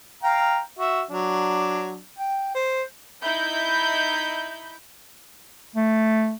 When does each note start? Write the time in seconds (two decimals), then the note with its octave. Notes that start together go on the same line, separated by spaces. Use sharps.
0.23 F5 G5 A#5
0.78 F#4 E5
1.10 F#3 D4
2.18 G5
2.55 C5
3.22 D#4 E4 B5 G6
5.75 A3